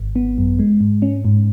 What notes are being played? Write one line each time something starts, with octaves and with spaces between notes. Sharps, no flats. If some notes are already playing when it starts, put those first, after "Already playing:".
Already playing: G#1
B3
F#2
G#3
G#2
C#4
G#2